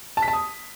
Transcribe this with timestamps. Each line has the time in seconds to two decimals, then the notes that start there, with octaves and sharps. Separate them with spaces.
0.17 A5
0.22 B6
0.28 A5
0.33 D#6